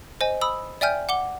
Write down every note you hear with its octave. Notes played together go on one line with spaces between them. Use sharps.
C5 D#5 G#5
B5 D#6 E6
D5 E5 G5 G#5 F6 G6
F#5 D6 G7